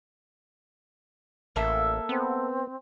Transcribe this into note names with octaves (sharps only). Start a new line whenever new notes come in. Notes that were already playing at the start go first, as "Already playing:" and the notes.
A1 A#3 A4 E5
B3 C4